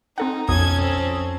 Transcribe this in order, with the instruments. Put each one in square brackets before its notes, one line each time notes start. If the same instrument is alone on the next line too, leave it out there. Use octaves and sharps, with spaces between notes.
[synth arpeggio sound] C4 A4 F#5 [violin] D#4
[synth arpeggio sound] B1 [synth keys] F2 D#6 [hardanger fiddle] C#4 A4 [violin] G#6
[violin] C4